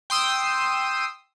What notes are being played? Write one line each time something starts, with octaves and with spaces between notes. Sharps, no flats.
G5 C6 D#6 E6